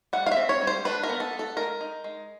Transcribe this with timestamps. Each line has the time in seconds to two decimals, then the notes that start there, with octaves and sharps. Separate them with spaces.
0.13 G3 F#5
0.26 F5
0.32 E5
0.37 C4
0.49 C#5
0.61 G3
0.67 C5
0.85 D4 B4
1.03 A#4
1.09 B3
1.20 A4
1.33 B3
1.39 A4
1.56 G#3 A#4
1.81 D#4
2.04 G#3